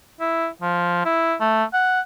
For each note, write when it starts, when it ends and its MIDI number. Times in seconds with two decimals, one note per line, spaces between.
0.20 0.48 64
0.62 1.04 53
1.05 1.35 64
1.40 1.64 57
1.73 2.00 78